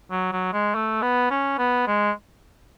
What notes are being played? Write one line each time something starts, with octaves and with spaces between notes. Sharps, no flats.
F#3
F#3
G#3
A3
B3
C#4
B3
G#3